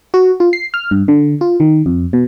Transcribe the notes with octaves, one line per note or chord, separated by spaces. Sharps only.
F#4
F4
C7
F6
G2
D3
F4
D#3
F2
B2